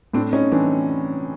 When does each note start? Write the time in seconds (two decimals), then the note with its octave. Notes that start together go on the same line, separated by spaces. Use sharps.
0.13 A2 C4 D4
0.33 C#4 D#4
0.52 E3 C4 D4